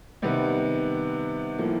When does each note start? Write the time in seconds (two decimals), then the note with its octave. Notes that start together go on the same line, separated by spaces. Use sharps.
0.22 C3 D#3 G3 B3
1.58 A2 F3 A#3